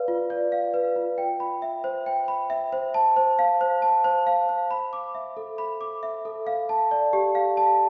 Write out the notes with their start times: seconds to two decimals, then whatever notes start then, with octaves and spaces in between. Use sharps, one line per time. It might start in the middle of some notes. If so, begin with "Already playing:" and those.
Already playing: B4 D5 F5
0.08 F4
0.30 D5
0.52 F5
0.74 B4
0.96 F4
1.18 G5
1.40 B5
1.62 E5
1.84 C5
2.06 G5
2.28 B5
2.50 E5
2.73 C5
2.94 A5
3.16 C5
3.39 F5
3.61 C5
3.82 A5
4.04 C5
4.27 F5
4.49 C5
4.71 B5
4.93 D6
5.15 E5
5.37 A4
5.58 B5
5.81 D6
6.03 E5
6.25 A4
6.47 F5
6.69 A5
6.91 D5
7.13 G4
7.35 F5
7.57 A5